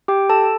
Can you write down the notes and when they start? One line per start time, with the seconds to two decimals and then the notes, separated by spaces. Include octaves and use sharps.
0.08 G4 G5
0.29 A4 A5